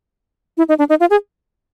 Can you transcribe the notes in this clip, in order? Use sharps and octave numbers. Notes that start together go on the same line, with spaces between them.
E4
D#4
D4
D#4
F4
G#4